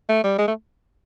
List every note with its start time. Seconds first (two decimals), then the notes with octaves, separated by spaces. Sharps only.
0.09 A3
0.23 G3
0.38 G#3
0.48 A3